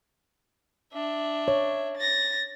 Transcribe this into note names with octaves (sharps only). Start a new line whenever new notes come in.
D4 E5
C#5
A6 A#6